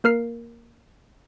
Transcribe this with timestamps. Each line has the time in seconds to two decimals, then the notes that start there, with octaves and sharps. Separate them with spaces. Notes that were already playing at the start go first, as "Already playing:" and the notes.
0.04 A#3 A#4 F6 C7